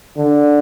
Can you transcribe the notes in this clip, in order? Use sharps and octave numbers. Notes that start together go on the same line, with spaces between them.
D3